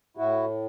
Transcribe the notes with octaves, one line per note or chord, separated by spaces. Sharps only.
A2 E4 F#4